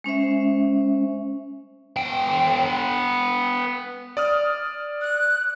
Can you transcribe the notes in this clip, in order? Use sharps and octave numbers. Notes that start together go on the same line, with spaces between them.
G#3 C#4 C5 E5
B3 G5
D5 D#6 F6
F#6